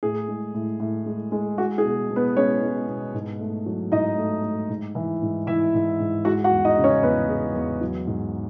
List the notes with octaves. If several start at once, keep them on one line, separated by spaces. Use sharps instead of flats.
A2 G#4
G#3
A2
A2
G#3
G#3
G#3 F#4
G#4
B2
B2
B3 B4
G#3 C#4 C#5
G#3
B2
G#2
A3
F#3
G#2 D#4 D#5
A3
A3
G#2
E3
G#2
E3 E4 E5
G#2
G#2
G#3 F#4 F#5
F#4 F#5
E2
D#4 D#5
C#3
C#4 C#5
E2 B3 B4
G#3
E2
F#3
G#2